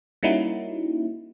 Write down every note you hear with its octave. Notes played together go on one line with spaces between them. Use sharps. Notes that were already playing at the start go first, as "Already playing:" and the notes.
G3 A#3 C#4 D#4 E4 F#4